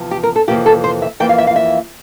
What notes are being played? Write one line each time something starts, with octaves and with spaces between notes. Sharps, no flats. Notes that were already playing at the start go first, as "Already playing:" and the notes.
Already playing: E2 C3 F3
G4
A#4
A4
F2 C3 E3 A#3 F4 G4
A4
C5
E5
F2 E3 A#3 F4 G5
F5
E5
F5
E5